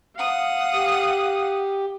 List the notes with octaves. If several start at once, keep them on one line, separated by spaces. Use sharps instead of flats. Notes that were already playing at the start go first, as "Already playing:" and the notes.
F5 F#5 D#6
G4